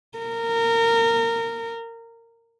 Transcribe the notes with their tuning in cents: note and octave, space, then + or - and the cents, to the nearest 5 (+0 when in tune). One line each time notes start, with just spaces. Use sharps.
A#4 -20